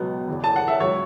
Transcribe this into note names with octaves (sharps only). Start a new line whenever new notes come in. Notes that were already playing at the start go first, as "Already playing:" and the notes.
Already playing: C#2 B2 F#3 B3
E2 C#3 E3
A5
F#5
E5
C#2 C#3 F#3 C#5